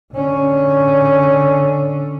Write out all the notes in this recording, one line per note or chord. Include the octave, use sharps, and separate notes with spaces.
D3 C#4